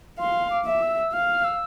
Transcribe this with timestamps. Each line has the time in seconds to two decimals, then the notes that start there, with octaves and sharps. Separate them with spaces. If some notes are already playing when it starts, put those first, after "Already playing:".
0.19 F5 C6
0.51 D6
0.66 E5
0.82 E6
1.13 F5 F6
1.44 E6